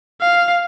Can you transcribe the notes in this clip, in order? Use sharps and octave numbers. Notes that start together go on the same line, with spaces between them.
F5